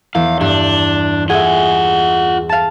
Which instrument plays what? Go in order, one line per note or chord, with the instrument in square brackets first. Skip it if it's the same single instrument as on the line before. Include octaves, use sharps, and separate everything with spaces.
[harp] E2 [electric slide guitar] F5
[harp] G2 [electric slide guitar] D4
[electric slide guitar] F4 D#5 F#5 [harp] G#4 E5
[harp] F5 A5